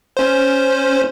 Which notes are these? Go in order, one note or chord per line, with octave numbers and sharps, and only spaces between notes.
C#4 C5